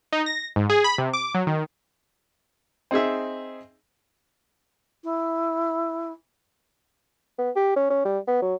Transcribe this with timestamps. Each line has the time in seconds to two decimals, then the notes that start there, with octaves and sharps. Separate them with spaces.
0.13 D#4
0.26 A#6
0.56 G#2
0.69 G#4
0.84 B5
0.98 C3
1.13 D6
1.35 F#3
1.47 D#3
2.91 C4 D#4 G#4 E5
5.03 E4
7.38 B3
7.56 G4
7.76 C#4
7.90 C#4
8.05 G3
8.27 B3
8.42 F#3